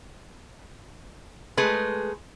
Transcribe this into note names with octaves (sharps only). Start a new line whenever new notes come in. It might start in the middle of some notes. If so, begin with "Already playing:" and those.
G#3 A3 G#4 B4